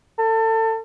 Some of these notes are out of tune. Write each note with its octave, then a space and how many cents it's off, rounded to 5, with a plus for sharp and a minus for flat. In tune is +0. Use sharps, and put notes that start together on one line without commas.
A4 +25